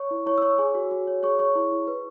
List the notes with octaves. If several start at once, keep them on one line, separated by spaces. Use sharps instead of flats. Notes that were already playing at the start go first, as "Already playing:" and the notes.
Already playing: C#5 C#6
E4
E4 C#5 C#6
E6
C#5 C#6
G#4 C#5 G#5
F#4
F#4
C#5
G#4 C#5 C#6
C#5 C#6
E4
E4
B4